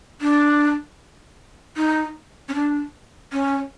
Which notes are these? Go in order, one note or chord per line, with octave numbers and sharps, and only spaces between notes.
D4
D#4
C#4
D4
C#4